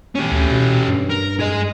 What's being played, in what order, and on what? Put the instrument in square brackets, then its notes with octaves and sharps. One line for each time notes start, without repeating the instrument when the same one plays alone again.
[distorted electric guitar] C#4 G4
[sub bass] D2
B2
G2
[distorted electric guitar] A#4
G#4 D#5